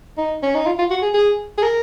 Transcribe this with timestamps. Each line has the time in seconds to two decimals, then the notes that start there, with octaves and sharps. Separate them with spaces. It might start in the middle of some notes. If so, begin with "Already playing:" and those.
0.18 D#4
0.43 C#4
0.55 D#4
0.66 F4
0.79 F4
0.90 F#4
1.02 G#4
1.14 G#4
1.58 G#4
1.63 A#4